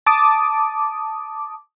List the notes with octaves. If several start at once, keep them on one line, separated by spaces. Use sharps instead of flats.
A5 D6 D#6